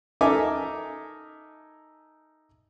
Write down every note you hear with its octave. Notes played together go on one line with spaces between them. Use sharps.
D#4 A4 A#4 E5 G#5 D6